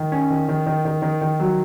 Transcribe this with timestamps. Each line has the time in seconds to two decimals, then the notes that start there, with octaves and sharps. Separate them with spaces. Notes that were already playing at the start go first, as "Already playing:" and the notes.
Already playing: D#3
0.12 C#4
0.30 D#3
0.49 D#3
0.66 D#3
0.85 D#3
1.02 D#3
1.21 D#3
1.40 F#3